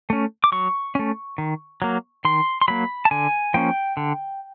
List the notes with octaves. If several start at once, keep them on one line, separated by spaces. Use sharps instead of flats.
A3 C#4
D6
F#3 C#6
A3 C#4
D#3
F#3 A#3
D#3 C6
C6
F#3 A#3 B5
A5
D3 G#5
F3 A#3 C#4 G5
D3